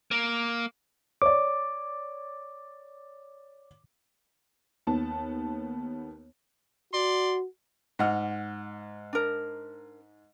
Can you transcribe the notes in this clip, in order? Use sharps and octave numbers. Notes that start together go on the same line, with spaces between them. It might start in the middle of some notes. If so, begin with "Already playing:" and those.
A#3
C#5 D5 D6
D#2 B3 A5
F#4 D5 C6
G#2 D#5 F#5 F6
D4 A#4